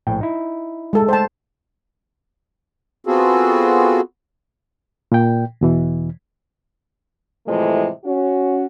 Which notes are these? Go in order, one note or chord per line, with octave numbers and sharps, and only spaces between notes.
A#1 A2 G5
D#4 E4
G#3 A4
A3 C5 G5 A5
B3 C4 F4 F#4 G#4 A4
A#2 G5
E2 B2 E3
A2 C3 E3 F3 G#3 A3
C#4 F#4